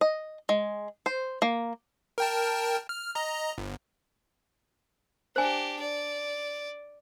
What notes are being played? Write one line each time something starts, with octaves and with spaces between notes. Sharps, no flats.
D#5
G#3
C5
A#3
A#4 G5 A5
F6
D#5 A#5
G1
D4 G4 C5 G#5
D5